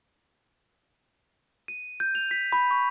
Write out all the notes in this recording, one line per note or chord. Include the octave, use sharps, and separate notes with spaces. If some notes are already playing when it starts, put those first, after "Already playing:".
D#7
G6
F7
B6
B5
C#6